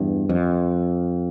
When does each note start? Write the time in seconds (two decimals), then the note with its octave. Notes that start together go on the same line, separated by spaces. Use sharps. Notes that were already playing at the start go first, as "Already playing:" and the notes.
Already playing: E2 G2
0.29 F2